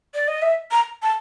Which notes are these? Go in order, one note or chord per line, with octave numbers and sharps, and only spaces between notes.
D5
D#5
E5
A#5
A5